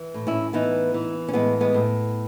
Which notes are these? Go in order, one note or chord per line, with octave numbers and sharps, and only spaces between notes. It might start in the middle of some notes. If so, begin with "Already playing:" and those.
Already playing: E3
A2
C#4 E4
E3 B3 D#4
E3
C#4
A2 G#3 B3
G#3 B3
A2